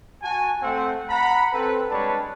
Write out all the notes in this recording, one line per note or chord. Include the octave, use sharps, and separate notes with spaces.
F#4 G#5 A5
A3 C4 F#5
F#5 A#5 B5
C4 A4 B4
G3 G#3 D4 B4 C#5 A5